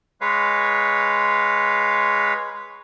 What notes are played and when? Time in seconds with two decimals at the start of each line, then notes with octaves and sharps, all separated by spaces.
0.21 G#3 B4 C#5 F5